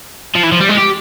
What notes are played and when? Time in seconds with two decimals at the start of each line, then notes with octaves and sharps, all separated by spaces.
0.35 F3
0.44 E3
0.52 F3
0.60 G3
0.69 G#3
0.77 G4